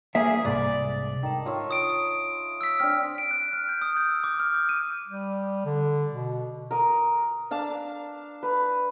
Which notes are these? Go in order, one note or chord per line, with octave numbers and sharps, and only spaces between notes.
A#3 G#4 E5
C2 G#2 D5
D#3 A5
F4 C#5 E5
D#6 D7
E6 B6
C4 D4 F6
D7
F#6
F6
G6
D#6
G6
E6
D6
F6
G6
D#7
G3
D3
B2
A#4 D#6
D4 F5 A5
B4